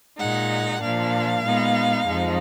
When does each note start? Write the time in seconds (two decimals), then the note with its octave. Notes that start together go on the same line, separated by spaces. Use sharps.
0.18 A#2 G#3 D#4 F#5
0.81 A#2 F3 A#3 D4 F5
1.43 A#2 G#3 B3 D#4
2.05 F2 F3 G#3 D#4